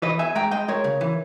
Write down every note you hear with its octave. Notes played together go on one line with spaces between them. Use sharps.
E3 B4 D#5
E2 E5 G#5
G#3 G5 A#5
G#3 D#5 G5
G#3 A#4 C#5
C#3
E3